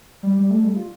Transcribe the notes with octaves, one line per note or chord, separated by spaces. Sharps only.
G3
G3
A3
G3
F4